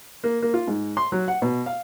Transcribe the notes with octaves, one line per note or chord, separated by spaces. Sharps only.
A#3
A#3
F4
G#2
C6
F#3
F#5
B2
F5